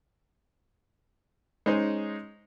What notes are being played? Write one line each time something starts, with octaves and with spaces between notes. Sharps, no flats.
G#3 C#4 D#4 C5